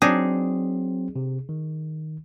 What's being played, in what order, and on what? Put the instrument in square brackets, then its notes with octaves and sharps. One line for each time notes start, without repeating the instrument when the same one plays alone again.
[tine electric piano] F#3 C4 [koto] D4 D#4 G#4
[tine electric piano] C3
D#3